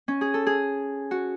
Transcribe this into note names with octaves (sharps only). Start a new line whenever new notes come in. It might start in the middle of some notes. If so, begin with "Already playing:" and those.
C#4
G#4
A4
G#4
F#4